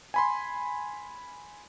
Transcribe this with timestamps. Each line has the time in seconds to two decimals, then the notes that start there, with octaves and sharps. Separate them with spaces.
0.14 G#5 B5 C6